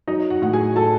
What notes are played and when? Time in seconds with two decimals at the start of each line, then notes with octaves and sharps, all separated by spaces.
0.07 F#3 D#4 D#5
0.30 F#4 F#5
0.42 A2 F#5
0.53 G#4 G#5
0.76 F#3 A4 A5